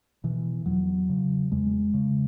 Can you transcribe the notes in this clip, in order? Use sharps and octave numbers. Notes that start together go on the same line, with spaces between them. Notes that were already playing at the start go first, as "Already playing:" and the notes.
B2 E3
E2 F#3
C#3
E2 G#3
C#3